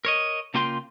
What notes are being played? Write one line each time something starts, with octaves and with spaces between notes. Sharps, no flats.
A#4 C#5 D#5
C#3 A#3 F4 G5 C6